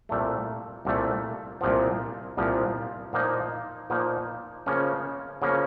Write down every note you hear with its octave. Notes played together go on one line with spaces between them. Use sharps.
C2 A#2 A3
C2 A#2 A3
C2 A#2 F3
C2 A#2 F3
A#2 F3 A#3 D#4
A#2 F3 A#3 D#4
C#3 F3 A#3 C#4
C#3 F3 A#3 C#4